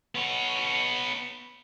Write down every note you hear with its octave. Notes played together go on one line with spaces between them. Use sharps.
B3 C#5